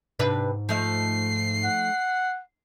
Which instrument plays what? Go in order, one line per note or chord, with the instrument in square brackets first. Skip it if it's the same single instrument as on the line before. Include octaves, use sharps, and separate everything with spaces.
[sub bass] G#2 [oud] C3 D4 B4
[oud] F3 A3 D#4 [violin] C7
[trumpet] F#5